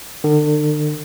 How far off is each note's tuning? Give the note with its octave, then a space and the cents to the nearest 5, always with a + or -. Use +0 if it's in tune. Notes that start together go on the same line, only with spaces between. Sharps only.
D3 +40